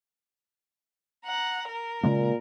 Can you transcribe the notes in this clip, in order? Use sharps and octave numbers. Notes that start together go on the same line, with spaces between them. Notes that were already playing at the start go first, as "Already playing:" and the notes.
F#5 A#5
A#4
A#2 C#3 G#3 A#3